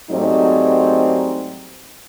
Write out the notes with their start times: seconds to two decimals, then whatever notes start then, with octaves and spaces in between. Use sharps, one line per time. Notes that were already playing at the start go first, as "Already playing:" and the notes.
0.11 G#2 F#3 G3 A3 C4 D#4